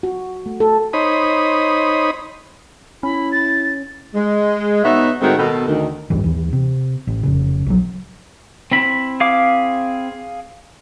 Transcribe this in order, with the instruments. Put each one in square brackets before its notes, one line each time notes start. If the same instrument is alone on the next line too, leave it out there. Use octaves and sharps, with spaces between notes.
[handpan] F#4
A3
A4
[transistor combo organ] D#4 C5 C#5 B5 D#6
[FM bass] C#4 [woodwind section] E4 [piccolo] B5
[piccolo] A6
[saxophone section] G#3
B2 B3 D#4 C#5 E5
A2 D#3 G#3 A3 C4 F#4
B2 D#3 A4
D2 D#3
[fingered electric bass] A1 D2 G2 E3
D#2 E3
C3
A1
F1 C#3
A#1 F#3
[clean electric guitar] C4 E4 B5
[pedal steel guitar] G#4 F5 D6